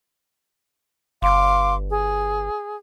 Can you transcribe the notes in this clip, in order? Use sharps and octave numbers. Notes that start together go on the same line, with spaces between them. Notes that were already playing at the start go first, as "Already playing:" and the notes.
G1 F5 C6 D6
G#4